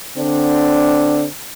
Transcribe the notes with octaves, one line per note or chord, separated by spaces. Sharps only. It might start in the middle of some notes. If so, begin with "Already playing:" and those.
D3 C4 D4